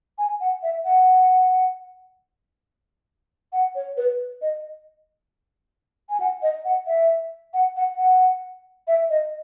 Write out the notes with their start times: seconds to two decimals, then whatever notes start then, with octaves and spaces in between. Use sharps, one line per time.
0.18 G#5
0.41 F#5
0.63 E5
0.85 F#5
3.53 F#5
3.75 C#5
3.97 B4
4.42 D#5
6.10 G#5
6.20 F#5
6.42 D#5
6.65 F#5
6.87 E5
7.54 F#5
7.76 F#5
7.98 F#5
8.88 E5
9.10 D#5